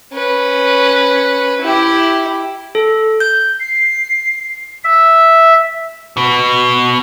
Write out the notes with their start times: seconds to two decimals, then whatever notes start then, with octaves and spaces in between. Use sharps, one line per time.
0.13 C#4 B4
1.62 E4 G4
2.75 A4
3.20 G6
3.59 C7
4.84 E5
6.17 B2 B3